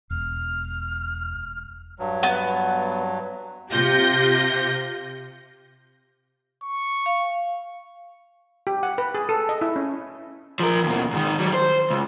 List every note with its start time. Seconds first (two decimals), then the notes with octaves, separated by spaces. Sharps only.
0.10 E1 E2 F6
1.99 G2 F#3
2.23 B3
3.71 C3 F4 G4 G6 A#6
6.63 C#6
7.06 F5
8.67 G4
8.83 F#5
8.98 B4
9.14 G#4
9.29 A4
9.49 D#5
9.61 E4
9.76 C#4
10.60 F3 A#4
10.84 D#2 B2
11.13 G#2 D#3
11.39 F#3 G3
11.54 C5
11.90 C#2